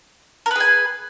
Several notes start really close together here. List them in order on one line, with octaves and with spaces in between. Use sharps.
A#4 B4 G#4 G#5